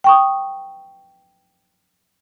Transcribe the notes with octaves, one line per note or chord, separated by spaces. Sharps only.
G5 C#6 D#6